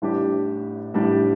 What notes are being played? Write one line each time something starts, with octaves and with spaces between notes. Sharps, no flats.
A1 A2 G3 D4 G4
A1 A2 G3 D4 G4